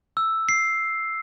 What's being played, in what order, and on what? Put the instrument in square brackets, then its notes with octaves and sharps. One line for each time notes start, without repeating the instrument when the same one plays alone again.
[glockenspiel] E6
C7